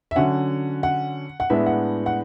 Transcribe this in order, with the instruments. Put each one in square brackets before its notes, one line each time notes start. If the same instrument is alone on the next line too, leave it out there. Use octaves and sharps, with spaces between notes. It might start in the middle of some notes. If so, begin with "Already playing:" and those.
[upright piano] E5
D3 F#3 C#4 F#5
F#5
F#5
A2 G#3 B3 D4 E5
F#5
F#5